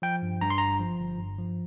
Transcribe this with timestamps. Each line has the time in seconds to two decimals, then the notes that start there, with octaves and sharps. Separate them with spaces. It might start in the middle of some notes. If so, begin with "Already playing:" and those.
0.02 F3 G5
0.22 G2
0.41 G2 A#5
0.50 C6
0.58 G1 A#5
0.79 F3
0.99 G1
1.18 G2
1.38 F3